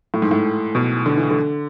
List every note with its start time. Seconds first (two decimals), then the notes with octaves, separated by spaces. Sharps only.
0.14 A2
0.22 G#2
0.31 A2
0.75 B2
1.06 D3
1.17 E3
1.31 D3